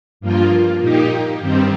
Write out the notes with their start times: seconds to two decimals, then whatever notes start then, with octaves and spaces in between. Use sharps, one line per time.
0.21 G2 F3 A#3 F4
0.81 A#2 A#3 D#4 G4
1.40 G2 D#3 G3 C4